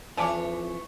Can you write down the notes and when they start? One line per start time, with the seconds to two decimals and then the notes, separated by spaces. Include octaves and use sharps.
0.17 F2 E3 D4 C#5 G#5 A5 D6